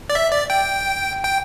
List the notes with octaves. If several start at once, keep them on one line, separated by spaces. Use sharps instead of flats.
D5
E5
D5
G5
G5